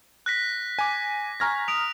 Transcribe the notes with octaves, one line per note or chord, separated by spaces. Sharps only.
F#6 A#6 B6
G#5 D6
G#5 A#5 C#6 F6 G#6 A#6
D#6 D7 F7